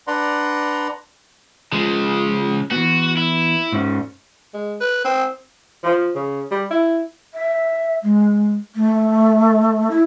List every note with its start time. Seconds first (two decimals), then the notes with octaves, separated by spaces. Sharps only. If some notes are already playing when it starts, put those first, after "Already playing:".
0.07 D4 B4 D5 F#5 A#5 C6
1.72 C#3 F3 G#3
2.71 E3 B3 F#4
3.17 E4
3.72 G#2 C#4
4.54 G#3
4.81 B4
5.05 C4
5.83 F3
6.15 C#3
6.51 G3
6.70 E4
7.33 E5
8.03 G#3
8.75 A3
9.90 E4